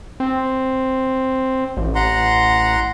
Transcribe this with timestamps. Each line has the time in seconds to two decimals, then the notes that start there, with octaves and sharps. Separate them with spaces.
0.20 C4
1.77 A1
1.95 F#5 A#5 C6